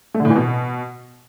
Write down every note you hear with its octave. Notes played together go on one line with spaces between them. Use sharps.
A3
D3
A2
E3
B2